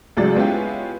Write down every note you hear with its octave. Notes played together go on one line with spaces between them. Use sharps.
C#2 A2 F#3 D5 A6
G#3 B3 C#4 E4 F4 G4